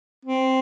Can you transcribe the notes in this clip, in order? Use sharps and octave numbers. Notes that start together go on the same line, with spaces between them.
C4